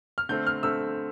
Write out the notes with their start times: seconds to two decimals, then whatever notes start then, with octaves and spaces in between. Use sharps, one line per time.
0.18 F6
0.29 D3 A3 C4 G6
0.47 F6
0.63 D3 A3 C4 E6